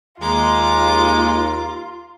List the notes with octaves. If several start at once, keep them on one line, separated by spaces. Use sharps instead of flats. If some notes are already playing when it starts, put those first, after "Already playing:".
D#2 G#3 F4 A#5 D6